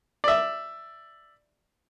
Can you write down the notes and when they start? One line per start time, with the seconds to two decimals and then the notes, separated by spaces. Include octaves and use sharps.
0.24 D5 E5